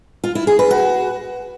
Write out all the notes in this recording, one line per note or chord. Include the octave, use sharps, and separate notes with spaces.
F4
E4
G#4
B4
F#4